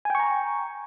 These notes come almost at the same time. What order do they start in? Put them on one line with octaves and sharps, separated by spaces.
G#5 G5 C#6 A#5